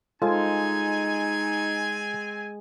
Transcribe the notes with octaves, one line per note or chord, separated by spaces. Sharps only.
G#3 C4 D#4 F4 A4 C5 G#5